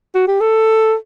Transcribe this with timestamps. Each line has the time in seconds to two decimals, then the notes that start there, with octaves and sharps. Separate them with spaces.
0.15 F#4
0.28 G4
0.41 A4